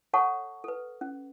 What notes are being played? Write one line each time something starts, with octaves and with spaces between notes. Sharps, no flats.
A4 C#5 F#5 A5 C#6
A4 B4
C#4